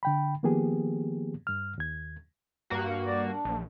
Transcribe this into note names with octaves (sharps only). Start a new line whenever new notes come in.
D3 G5 B5
D#3 F3 A#3 B3 G4 G#4
G2 F6
D#2 G#6
G2 A#3 F#4
D5
D4
A#1